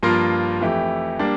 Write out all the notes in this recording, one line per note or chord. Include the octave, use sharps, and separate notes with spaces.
G2 F3 A#3 F4 A#4
F2 E3 A3 E4 G4
G3 A#3 D4